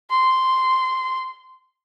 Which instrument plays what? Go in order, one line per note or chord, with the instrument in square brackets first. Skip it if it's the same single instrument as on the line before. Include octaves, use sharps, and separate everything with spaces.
[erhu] C6